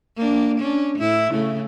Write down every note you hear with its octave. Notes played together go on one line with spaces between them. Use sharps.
A#3 D4
C#4 D4
A2 E4
C#3 A3